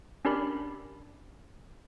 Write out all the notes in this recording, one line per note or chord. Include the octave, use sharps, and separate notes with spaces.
C#4 D4 G4 A#4 D5 B5